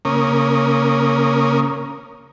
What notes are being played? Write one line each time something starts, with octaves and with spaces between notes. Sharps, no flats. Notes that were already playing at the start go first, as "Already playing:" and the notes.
C#3 A#3 C#4 A#4 D#6